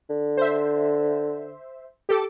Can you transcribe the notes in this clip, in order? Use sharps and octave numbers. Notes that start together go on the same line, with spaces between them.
D3
C5 E5
G4 A4 D6